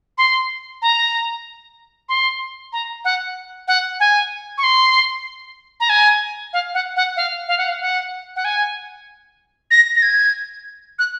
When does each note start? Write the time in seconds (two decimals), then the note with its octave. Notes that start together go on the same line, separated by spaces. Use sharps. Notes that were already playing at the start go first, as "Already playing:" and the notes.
0.18 C6
0.82 A#5
2.09 C6
2.73 A#5
3.05 F#5
3.68 F#5
4.00 G#5
4.58 C#6
4.63 C6
5.80 A#5
5.89 G#5
6.53 F5
6.74 F#5
6.96 F#5
7.16 F5
7.48 F5
7.58 F#5
7.69 F5
7.80 F#5
8.36 F#5
8.45 G#5
9.71 A#6
9.96 A#6
10.02 G#6
10.99 F#6